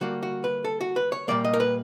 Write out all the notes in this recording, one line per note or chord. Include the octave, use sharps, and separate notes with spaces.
D3 G3 A#3 F#4
F#4
B4
A4
F#4
B4
C#5
A#2 G3 A#3 D5
D#5
A#4
B4